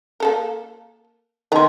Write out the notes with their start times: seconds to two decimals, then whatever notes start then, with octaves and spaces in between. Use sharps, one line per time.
0.20 A#3 A4 A#4
1.52 D#3 B3 G5 A#5 C6